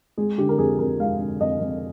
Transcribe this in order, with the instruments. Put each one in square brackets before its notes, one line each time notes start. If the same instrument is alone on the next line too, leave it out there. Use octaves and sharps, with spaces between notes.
[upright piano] G#3 G#4
D3 G4
A#4
F2 G#4
F2 A#4
G#3 F5
D3
F2 D#5
F2